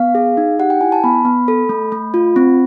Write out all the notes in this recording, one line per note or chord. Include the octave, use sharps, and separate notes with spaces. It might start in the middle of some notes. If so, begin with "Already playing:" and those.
Already playing: B3 F5
G#4
D#4
G4 F#5
G5
E4 G#5
A5
B3 B5
B3
A4
A3
A3
F4
C4